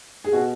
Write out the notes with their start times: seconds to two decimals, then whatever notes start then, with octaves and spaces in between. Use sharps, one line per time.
0.24 G#4
0.33 B2 F#4